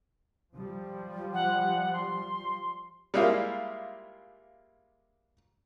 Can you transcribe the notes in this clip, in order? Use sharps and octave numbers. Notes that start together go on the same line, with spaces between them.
F3 G3
F#5
C6
G3 G#3 A#3 E4 F4